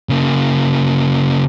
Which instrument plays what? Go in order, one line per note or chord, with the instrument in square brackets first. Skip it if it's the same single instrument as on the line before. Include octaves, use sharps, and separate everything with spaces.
[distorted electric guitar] C#3 A#3